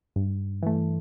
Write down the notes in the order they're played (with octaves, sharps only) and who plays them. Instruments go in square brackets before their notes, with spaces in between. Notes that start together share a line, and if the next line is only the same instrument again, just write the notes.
[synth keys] G2
E3 A3